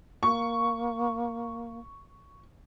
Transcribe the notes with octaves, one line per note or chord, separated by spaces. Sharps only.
A#3 C#6